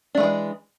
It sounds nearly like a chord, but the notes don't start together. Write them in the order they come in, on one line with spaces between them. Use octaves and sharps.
D4 A3 E3 G#3